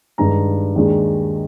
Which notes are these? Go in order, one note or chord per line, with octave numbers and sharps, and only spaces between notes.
G2 D#3 G#3 A#5
D#2 D#3 G#3 D4